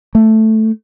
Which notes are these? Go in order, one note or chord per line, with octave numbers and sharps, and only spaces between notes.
A3